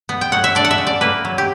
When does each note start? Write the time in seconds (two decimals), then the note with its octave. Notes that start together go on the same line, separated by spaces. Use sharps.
0.09 B3
0.21 G5
0.32 F#3 F#5
0.44 E5
0.55 D4 D5
0.65 F#5
0.71 E5
0.78 C#3
0.87 D5
1.01 A#3 B4
1.25 F#3
1.38 G4